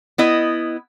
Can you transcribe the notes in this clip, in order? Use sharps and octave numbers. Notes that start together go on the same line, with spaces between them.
B3 E4 D#5